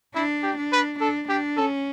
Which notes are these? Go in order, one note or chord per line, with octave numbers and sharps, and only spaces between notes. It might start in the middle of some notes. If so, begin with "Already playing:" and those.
D4 E4
G4
D4
B4
D4 A4
D4 G4
C#4 A4